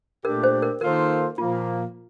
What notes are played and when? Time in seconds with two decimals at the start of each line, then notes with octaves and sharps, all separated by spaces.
0.25 A#2 A3 D4 G4 A#4
0.43 C5
0.62 A#4
0.81 D#3 A#3 F4 A4 A#4 C5
1.38 A#2 F3 A#3 F4